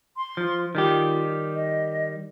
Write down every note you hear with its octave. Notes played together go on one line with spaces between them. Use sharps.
C6
F3
D#3 G3 F4 G4
D#5